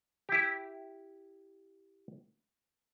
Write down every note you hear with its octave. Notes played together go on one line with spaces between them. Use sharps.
E4 G4